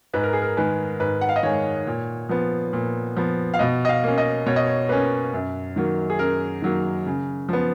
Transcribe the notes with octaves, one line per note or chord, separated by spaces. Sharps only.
G#2 B4
A#4
G#4
A#4
D#3 G#3 B4
G#2 B4
F#5
F5
D#5
D#3 G#3 C#5
A#2
F3 B3
A#2
F3 B3
F5
B2 D#5
D#5
F5
A#3 C#4
D#5
B2 C#5
D#5
C#5
A#3 C#4 B4
F#2
D#3 F#3 A#3
G#4
F#2 A#4
D#3 F#3 A#3
C#3
F3 B3